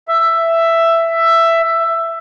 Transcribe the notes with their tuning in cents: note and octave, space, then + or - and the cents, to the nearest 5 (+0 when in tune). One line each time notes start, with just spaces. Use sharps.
E5 +10